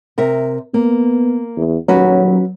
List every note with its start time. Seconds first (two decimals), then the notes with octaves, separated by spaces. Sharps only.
0.18 C3 A#4 E5
0.74 A#3 B3
1.57 E2
1.88 D#1 F#3 C#4 F#4 B4